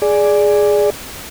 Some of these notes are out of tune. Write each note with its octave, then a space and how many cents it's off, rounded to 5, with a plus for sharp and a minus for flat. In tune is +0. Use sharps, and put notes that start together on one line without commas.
G#4 +0 D5 +0